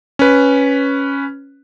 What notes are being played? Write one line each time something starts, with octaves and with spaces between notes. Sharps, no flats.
C#4 B4